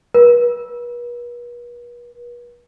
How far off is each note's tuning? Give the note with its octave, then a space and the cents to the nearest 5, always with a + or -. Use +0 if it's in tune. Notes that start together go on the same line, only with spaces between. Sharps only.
B4 -45